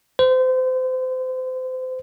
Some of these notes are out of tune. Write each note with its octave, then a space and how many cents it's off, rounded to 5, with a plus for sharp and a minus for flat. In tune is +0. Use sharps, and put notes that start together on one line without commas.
C5 -30